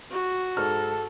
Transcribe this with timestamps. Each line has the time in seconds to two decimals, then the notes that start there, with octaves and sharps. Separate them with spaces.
0.11 F#4
0.57 G#2 A4 F6